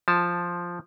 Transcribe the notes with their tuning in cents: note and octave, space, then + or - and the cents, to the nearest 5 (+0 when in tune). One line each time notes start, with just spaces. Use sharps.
F3 +0 A5 +0